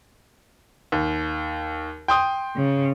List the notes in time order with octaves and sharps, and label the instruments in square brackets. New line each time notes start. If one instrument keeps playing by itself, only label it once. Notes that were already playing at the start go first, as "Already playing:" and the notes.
[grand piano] D#2
G5 C6 D#6
[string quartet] C#3